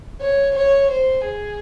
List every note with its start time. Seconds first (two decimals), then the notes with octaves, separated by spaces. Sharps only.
0.21 C#5
0.56 C#5
0.91 C5
1.25 G#4